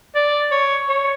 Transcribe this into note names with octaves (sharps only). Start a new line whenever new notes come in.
D5
C#5
C#5